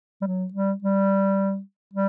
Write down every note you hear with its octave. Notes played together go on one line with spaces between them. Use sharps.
G3
F#3
G3
G3
G3